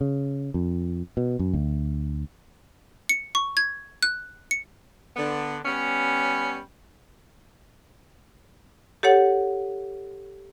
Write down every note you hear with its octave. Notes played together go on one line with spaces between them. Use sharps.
C#3
F2
B2
F#2
D2
C#7
C#6
G#6
F#6
C#7
D3 B3
G3 B3 C#4
G4 A4 C#5 F#5